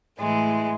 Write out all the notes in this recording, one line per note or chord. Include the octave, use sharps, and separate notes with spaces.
A2 E3 G#3